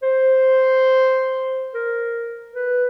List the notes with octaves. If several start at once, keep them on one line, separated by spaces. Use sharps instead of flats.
C5
A#4
B4